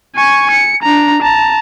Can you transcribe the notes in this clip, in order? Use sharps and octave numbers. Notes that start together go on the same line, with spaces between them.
G#5 C#6
C#7
D4 A#5
A5 A#5